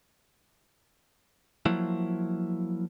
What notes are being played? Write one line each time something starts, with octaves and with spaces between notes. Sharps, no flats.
F3 F#3 A#3 E4